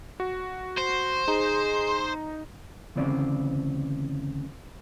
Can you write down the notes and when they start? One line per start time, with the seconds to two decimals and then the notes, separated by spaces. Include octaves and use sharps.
0.20 F#4
0.78 C5
1.28 D#4 G#4 A#5
2.95 D2 C#3 E3 C4 D5